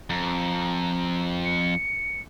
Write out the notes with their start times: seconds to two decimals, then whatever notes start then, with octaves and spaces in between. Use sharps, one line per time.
0.10 F2 A#5
1.45 C#7